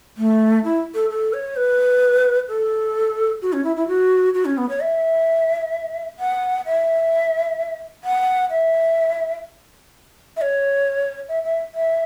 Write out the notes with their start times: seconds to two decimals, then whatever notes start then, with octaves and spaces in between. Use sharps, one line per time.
0.17 A3
0.64 E4
0.94 A4
1.10 A4
1.33 C#5
1.56 B4
2.48 A4
3.42 F#4
3.53 C#4
3.64 E4
3.76 E4
3.88 F#4
4.34 F#4
4.45 C#4
4.57 B3
4.69 C#5
4.80 E5
6.19 F#5
6.66 E5
8.04 F#5
8.50 E5
10.37 E5
10.41 C#5
11.29 E5
11.43 E5
11.75 E5